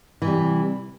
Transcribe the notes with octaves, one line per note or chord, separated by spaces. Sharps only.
C3 E3 G3